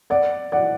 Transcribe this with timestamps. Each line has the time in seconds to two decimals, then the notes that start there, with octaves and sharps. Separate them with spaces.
0.10 D5 F#5
0.52 D5 F#5